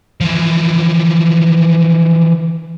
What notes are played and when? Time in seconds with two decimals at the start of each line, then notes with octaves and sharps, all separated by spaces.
0.21 E3 F3